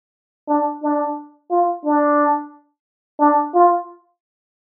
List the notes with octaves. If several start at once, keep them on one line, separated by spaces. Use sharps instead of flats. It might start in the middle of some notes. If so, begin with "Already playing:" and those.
D4
D4
F4
D4
D4
F4